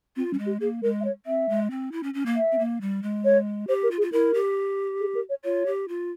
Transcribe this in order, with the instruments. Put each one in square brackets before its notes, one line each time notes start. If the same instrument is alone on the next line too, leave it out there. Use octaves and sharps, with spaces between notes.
[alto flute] C4 [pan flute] F4
[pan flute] G3 [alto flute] C#4
[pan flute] G#3
[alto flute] G4
[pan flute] A#3 [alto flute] G#4
[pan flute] G#3 [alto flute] A#4
[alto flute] E5
C#5
[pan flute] C4 [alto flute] E5
[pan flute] G#3
C4
E4
C#4
C#4
A#3
[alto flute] E5
[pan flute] C4
A#3
G3
G#3
[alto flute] C#5
[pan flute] G4 [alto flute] C5
[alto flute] A#4
[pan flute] F4
[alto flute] G#4
[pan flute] F4
[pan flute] E4 [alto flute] A#4
[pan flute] G4
[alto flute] G#4
A#4
C#5
[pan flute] F4 [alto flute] C#5
[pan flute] G4
F4